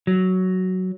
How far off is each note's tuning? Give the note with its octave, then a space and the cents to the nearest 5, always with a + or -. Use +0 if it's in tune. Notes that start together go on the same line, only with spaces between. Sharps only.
F#3 +5